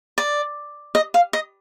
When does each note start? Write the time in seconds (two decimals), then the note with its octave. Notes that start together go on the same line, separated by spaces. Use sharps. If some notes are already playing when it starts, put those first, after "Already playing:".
0.18 D5
0.95 D#5
1.14 F5
1.33 D#5